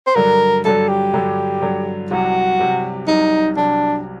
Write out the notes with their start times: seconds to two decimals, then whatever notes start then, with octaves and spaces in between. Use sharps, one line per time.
0.07 C5
0.16 G2 D3 F#3 A#4
0.65 G2 D3 F#3 A4
0.88 G4
1.14 G2 D3 F#3
1.62 G2 D3 F#3
2.11 C2 C3 F#3 F#4
2.60 C2 C3 F#3
3.07 C2 C3 F#3 D#4
3.57 C3 F#3 D4